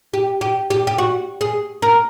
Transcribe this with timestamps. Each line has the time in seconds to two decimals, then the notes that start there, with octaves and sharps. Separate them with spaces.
0.13 G4
0.41 G4
0.70 G4
0.87 G4
0.98 F#4
1.41 G#4
1.82 A#4